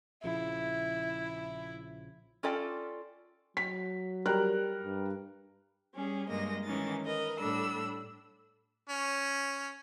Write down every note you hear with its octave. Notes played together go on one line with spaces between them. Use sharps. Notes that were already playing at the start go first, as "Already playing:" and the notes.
A#1 C#3 F3 E4
C#4 F4 A4 D5 G5
F#3 B6
G3 A#4 F#6
G2
G3 C#4 G#4
G2 G#3 A#3 D#5 A#6
D#3 E3 G#3 C#4 D#4 A6
A#4 B4 D#5
A2 G3 D4 A4 B5 E6
C#4